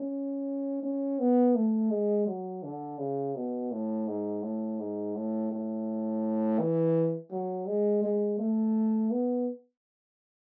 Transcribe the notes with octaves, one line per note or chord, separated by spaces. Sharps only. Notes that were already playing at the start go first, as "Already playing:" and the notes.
Already playing: C#4
C#4
B3
A3
G#3
F#3
D3
C#3
B2
A2
G#2
A2
G#2
A2
A2
E3
F#3
G#3
G#3
A3
B3